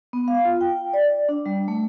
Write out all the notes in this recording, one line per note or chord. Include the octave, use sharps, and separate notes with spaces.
B3
F5
F4
G5
D5
D4
G3
A3